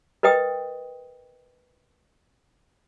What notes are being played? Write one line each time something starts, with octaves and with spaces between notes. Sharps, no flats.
A#4 B4 D#5 G5 D#6